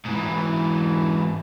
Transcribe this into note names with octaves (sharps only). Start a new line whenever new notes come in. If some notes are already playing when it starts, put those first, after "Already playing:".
G#2 E3